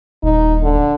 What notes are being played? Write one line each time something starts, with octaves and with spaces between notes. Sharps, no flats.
D#1 D#4
D3